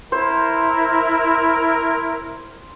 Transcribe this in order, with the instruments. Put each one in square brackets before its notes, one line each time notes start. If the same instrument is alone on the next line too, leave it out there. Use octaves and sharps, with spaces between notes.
[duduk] E4 [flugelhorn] A#4 [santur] C5